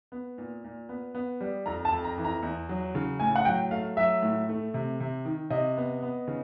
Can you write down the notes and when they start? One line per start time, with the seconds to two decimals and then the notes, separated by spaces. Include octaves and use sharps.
0.12 B3
0.38 A#2
0.64 A#2
0.89 B3
1.15 B3
1.41 G3
1.66 F2 A#5
1.85 A5
1.92 F2
2.04 A#5
2.18 E3
2.24 A#5
2.43 E2
2.69 F#3
2.95 C#3
3.20 A2 G#5
3.36 F#5
3.45 F#3 G5
3.71 A3 F5
3.97 F#3 E5
4.22 A2
4.49 A3
4.74 C3
5.00 C3
5.25 D#3
5.50 C3 D#5
5.77 B3
6.03 B3
6.28 C#3